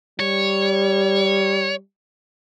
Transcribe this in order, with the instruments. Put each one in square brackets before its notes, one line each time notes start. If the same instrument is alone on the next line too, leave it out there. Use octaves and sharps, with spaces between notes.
[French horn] G3 [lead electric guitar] C#5